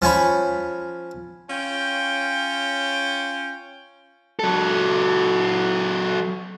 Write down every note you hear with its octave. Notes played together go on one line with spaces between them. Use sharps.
F3 C#4 C#5 B5
C#4 F4 C#5 G5
F#3 A4